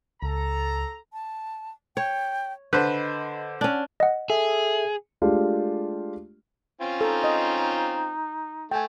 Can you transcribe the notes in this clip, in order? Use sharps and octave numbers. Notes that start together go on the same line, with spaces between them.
C#2 A4 A#5
A5
C#5 G5
D3 B4 C5 D#5
C#4 D4 F#5
D#5 F#5
G#4 A4 E5
G#3 A3 D4 F4 G4
C4 C#4 F4
D#4 A4
D#5
A3 G5 G#5